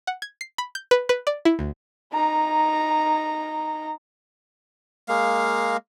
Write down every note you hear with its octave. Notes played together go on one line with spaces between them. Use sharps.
F#5
G#6
C7
B5
G6
B4
B4
D5
E4
D2
D#4 A#5
G#3 A#3 F5